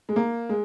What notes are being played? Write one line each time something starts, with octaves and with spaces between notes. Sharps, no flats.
G#3
A#3
G#3